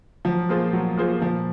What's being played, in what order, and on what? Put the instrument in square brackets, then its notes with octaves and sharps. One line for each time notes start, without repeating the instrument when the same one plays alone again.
[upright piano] F3 [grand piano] F#3
[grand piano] A#3 F4 G#4 C5
F#3
A#3 F4 G#4 C5
[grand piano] A#2 [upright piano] F3